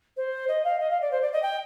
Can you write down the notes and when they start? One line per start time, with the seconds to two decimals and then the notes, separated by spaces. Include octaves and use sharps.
0.16 C5
0.48 D#5
0.64 F5
0.80 D#5
0.90 F5
1.01 D5
1.11 C5
1.22 D5
1.32 D#5
1.42 G5